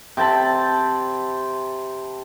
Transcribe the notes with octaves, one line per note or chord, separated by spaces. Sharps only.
C3 G5 A5 B5